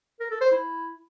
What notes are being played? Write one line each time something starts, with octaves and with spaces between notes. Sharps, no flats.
A#4
A4
C5
E4